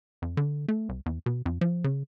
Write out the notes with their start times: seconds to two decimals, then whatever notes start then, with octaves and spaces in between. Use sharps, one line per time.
0.22 F2
0.37 D3
0.68 A3
0.89 C2
1.06 E2
1.26 B2
1.46 F2
1.61 F3
1.84 C#3